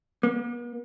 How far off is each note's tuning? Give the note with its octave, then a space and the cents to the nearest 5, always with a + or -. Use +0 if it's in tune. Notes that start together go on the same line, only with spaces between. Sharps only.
B3 -45